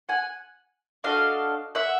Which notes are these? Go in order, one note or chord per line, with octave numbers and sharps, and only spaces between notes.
F#5 G#5
D4 F#4 A4 D#5 F5
E5 F#5